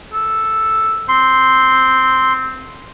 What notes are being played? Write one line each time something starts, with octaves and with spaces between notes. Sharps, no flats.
A4
C4 C6